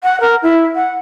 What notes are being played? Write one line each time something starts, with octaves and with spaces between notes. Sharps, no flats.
F#5
A#4
E4
F#5